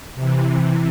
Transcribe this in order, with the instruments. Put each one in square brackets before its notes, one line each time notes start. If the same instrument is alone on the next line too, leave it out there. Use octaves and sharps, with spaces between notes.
[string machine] C3 E3